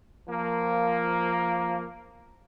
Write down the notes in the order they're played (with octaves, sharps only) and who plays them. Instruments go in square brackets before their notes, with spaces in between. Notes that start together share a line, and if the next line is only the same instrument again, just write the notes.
[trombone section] F3 A#3